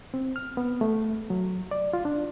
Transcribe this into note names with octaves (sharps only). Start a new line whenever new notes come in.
C4
F6
B3
A3
F#3
D5
F4
D4